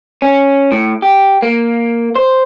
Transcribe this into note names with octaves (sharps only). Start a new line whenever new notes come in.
C#4
A2
G4
A#3
C5